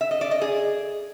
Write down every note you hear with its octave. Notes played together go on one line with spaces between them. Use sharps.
E5
D#5
D5
D#5
G#4